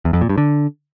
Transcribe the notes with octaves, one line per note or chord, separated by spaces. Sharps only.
E2
F2
A#2
G2
D3